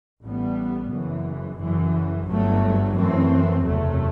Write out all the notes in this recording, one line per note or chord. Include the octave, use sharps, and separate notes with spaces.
A1 A2 G3 B3
F#1 F#2 E3
F#1 F#2 E3
G1 G2 F#3 A3
F#2 E3 A3 C4
F#1 E2 C3 F#3 A3